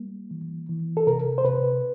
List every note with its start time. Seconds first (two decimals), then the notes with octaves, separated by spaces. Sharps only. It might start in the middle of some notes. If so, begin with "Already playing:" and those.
Already playing: G3 A#3
0.31 E3
0.69 E3
0.97 A4
1.07 C3 A#4
1.38 C5
1.44 C3 B4